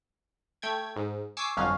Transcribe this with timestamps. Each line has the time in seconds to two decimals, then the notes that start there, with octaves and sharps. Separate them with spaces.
0.62 A3 G5 G#6
0.96 G#2
1.37 G#5 C#6 D6 E6 C7
1.57 G1 F2 F#3 C#4 F5